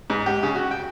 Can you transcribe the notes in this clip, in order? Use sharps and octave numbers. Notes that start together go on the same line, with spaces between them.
G#2
G4
C#3
F#4
G5